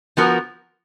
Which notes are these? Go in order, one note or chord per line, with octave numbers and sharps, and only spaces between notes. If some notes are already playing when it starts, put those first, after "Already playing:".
F3 B3 F#4 A#4